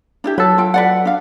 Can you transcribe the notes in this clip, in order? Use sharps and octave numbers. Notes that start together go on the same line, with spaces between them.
D4 E4 G4
F#3 A4 B4
F4 G5
B4 D5 F#5
D4 F5